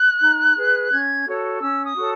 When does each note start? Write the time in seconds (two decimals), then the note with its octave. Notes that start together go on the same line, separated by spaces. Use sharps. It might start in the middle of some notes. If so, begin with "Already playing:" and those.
Already playing: F#6
0.21 D#4
0.56 G#4 B4
0.92 C#4 G#6
1.27 F#4 A4 C#5
1.61 C#4 E6
1.84 D#6
1.96 F#4 A4 C#5